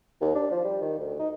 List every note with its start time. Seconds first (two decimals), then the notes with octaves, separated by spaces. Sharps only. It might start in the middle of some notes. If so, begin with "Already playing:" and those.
0.21 D#2
0.35 D4
0.51 F3
0.64 G3
0.81 D#3
0.99 D2
1.19 D#4